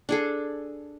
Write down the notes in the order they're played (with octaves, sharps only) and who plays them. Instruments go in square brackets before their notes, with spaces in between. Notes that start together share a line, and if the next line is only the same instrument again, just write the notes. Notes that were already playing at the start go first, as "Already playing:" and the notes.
[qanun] D4 G#4 A4